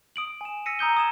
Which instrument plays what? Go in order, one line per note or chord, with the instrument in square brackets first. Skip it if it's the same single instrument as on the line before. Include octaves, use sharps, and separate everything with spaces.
[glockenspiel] D#6 D7 F#7
G#5 E7
E6 A#6 B6 C#7 D#7
A#5 D#6 G6 G7
D#6 G#6 E7